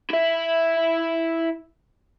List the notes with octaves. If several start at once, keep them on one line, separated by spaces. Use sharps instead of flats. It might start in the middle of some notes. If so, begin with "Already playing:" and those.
E4 E5